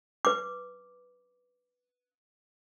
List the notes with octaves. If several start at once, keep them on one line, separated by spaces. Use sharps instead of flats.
B4 D6